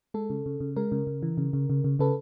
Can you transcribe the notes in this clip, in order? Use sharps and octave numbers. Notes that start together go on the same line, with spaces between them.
G#3 A4
C#3
C#3
C#3
G#3 A#4
C#3
C#3
E3
C#3
C#3
C#3
C#3
C#3 A4 B4